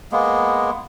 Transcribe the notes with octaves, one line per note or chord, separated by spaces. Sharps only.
G#3 A#3 B3